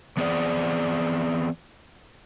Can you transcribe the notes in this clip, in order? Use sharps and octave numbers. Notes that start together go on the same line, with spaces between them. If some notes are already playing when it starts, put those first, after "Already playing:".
E3 B3 C4 G#4 D5